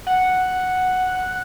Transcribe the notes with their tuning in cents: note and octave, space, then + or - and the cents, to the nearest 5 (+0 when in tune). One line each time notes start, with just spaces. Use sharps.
F#5 +0